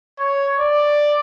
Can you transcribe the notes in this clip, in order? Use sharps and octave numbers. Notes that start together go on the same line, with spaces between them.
C#5
D5